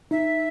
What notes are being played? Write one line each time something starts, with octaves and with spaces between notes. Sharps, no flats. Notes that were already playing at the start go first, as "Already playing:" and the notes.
D#4 E5